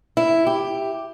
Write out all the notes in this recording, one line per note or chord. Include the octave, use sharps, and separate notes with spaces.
E4
G4